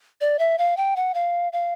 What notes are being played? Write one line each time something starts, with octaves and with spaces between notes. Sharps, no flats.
D5
E5
F5
G5
F#5
F5
F5